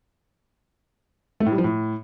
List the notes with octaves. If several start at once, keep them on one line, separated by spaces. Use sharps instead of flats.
A3
A2
G3
F3
A2